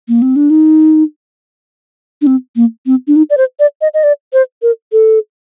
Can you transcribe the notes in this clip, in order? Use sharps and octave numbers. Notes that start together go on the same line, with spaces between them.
A#3
C4
D4
D#4
D4
C4
A#3
C4
D4
D#4
D5
C5
D5
D#5
D#5
D5
C5
A#4
A4